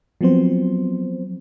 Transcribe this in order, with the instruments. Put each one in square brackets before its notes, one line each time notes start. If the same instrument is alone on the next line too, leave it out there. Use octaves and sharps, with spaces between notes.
[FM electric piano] F3 F#3 B3 C4 C5